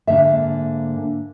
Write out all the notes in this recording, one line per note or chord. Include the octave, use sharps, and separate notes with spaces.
G#2 D3 A#3 E5